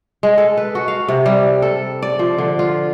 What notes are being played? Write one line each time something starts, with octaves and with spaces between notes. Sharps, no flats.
G#3
A4
B4
F#4
F5
C3
G3
A4
D5
F3
D3
F4